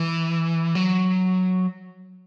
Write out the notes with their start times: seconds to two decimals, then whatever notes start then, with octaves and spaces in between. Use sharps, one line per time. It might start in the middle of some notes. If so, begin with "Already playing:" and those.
Already playing: E3
0.75 F#3